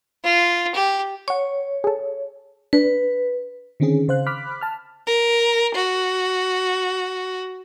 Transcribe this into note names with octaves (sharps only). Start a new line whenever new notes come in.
F4
G4
C#5 F#5 C#6
G#4 A4
D4 B4
D3 D#3 C4 C#4 G#4
C#3 C5 F5 F#6
B5 D6 F6 F#6 B6
A5 F6
A#4
F#4